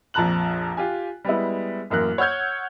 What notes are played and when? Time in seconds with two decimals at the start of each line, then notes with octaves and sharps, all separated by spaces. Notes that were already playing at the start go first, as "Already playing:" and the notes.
0.14 A#1 F2 A5 A#5 F#6 F#7
0.77 F4 G4 G#5
1.25 G3 G#3 B3 E4
1.90 A1 F#2 A#3 A#4 F#6
2.18 C#5 F#5 E6 F6 G6 G#6